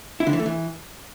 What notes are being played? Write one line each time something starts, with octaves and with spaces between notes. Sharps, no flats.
E4
D3
E3
A3
E3